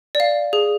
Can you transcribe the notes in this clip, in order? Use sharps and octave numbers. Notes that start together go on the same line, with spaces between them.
D5
F5
G#4